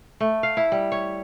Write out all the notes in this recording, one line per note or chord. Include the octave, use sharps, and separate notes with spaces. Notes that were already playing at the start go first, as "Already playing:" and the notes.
A3
F5
E4
G3
C#5